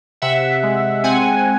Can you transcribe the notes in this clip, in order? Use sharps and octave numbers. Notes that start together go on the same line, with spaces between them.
C3 E5 F#5
G#3
C4 F#5 G#5